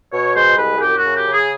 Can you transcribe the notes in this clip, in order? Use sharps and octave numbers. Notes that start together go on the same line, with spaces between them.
B2 C#5
G#3 C5
C2 B4
G#4
F#2 G4
F#4
C#3
G4
C#3
G#4